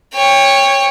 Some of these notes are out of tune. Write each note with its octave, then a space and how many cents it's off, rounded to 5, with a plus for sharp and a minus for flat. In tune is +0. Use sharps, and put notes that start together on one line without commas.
C#5 +0 G5 +30